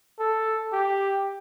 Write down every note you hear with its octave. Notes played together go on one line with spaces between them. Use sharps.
A4
G4